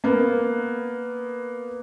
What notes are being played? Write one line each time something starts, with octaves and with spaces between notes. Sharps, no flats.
A#3 B3